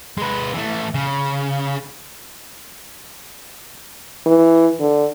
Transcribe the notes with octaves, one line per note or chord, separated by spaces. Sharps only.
G#3 B4
E3 A3
C#3
E3
D3